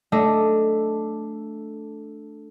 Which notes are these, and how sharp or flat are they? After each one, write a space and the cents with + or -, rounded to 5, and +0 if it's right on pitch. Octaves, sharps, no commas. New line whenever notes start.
A3 +0 D4 +0 D#5 +0